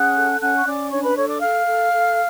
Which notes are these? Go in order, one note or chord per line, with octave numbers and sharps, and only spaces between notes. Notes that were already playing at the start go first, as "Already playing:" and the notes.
Already playing: C#4 G#4 F#5 F#6
A4
C#4 F#5 F#6
C#6
C#4 D5 D6
D4 C#5 C#6
B4 B5
A4 C#5 C#6
D5 D6
A4 F5 F6
A4
A4